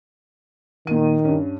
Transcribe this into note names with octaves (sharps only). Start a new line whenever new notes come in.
A#2 D#3 D#7
G2 C#4